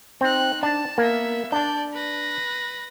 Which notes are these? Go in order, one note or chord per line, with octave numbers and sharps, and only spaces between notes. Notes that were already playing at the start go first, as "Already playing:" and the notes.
C4 D#4 F#6
D4 A5
A#3 B3 E5
D4 D5 A5 G6
B4 A#6